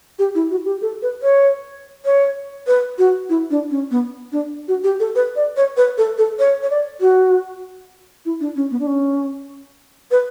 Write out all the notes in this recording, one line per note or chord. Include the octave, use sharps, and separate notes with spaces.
G4
E4
F#4
G4
A4
B4
C#5
C#5
B4
F#4
E4
D4
C#4
B3
D4
F#4
G4
A4
B4
D5
C#5
B4
A4
A4
C#5
C#5
D5
F#4
E4
D4
C#4
B3
D4
C#4
B4